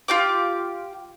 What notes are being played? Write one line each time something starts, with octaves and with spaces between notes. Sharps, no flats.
F4 G4 D6